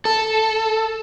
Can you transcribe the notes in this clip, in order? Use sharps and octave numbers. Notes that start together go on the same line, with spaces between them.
A4